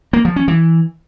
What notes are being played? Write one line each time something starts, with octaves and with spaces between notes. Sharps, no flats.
A#3
F3
C#4
E3